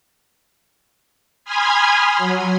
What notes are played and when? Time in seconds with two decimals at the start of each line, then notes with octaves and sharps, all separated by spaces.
1.45 G#5 B5 C6 D#6 F6 G#6
2.18 F#3